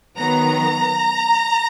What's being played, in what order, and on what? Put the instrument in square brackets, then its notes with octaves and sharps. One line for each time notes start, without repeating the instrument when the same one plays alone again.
[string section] D#3 F#3 B3 A#5